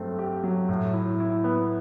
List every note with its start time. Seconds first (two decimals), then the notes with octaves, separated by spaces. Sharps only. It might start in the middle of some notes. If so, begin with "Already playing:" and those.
Already playing: G2 F#3 A3 C4
0.19 G4
0.43 F#3
0.69 A2
0.94 E4
1.20 E4
1.44 B3